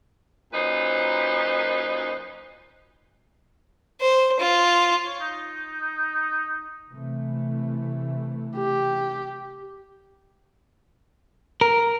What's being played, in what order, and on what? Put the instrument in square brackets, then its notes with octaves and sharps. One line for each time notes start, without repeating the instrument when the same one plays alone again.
[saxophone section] F#2 A#2 D#4 B4 C5
[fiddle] C5
F4
[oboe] C#5
D#4
[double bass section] C3 E3 A3
[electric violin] G4
[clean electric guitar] A#4